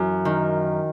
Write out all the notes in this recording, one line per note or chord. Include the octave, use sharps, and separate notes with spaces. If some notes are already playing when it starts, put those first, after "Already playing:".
Already playing: F#2 E3
D#3